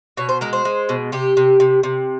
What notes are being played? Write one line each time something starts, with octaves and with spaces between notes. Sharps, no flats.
B2 C#5
C5
G#3 A#4
C5
G#3
B2
C3 G4
C3
C3
C3